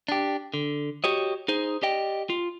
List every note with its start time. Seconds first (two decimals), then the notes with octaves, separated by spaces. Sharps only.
0.08 D4 G4
0.54 D3
1.04 F#4 G4 C#5 D#5
1.48 D#4 G#4 C5
1.83 G4 D5 D#5 G5
2.30 F4